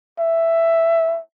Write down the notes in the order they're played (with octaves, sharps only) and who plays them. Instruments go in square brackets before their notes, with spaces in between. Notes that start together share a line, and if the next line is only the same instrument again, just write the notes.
[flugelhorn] E5